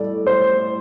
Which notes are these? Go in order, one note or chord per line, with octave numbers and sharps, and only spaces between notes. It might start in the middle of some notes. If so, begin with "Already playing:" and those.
Already playing: A2 G3 A4 D5
C5